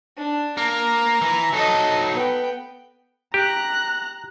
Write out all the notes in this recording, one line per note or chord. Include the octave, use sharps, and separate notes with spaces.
D4
A#3 A#5
E3
F#3 D#4 A4 D#5
B3 G5
G4 A#5 F#6